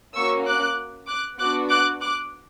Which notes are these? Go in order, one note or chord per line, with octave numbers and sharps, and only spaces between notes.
A#3 C#4 F#4 C#6 E6
D6 F#6
D6 F#6
B3 D4 F#4 D6 F#6
D6 F#6
D6 F#6